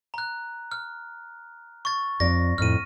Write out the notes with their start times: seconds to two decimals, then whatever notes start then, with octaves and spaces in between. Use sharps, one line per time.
0.14 A#5 F#6
0.72 F6
1.85 C#6 A6
2.20 F2 D5 A#6
2.58 F2 A2 F6 D#7